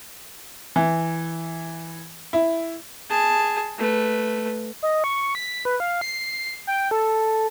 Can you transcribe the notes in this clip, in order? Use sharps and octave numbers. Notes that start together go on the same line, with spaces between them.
E3
E4
G#4 A5
A3 B4
D#5
C#6
B6
B4
F5
C7
G5
A4